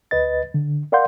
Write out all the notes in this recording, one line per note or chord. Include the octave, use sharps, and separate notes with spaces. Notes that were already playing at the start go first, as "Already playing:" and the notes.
D2 B4 D#5 A6
D3
A#4 D5 F5 F#5 C6 G6